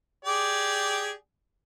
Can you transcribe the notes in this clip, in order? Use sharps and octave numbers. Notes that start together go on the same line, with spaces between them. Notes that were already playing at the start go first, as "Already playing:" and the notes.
G4 G#4 D5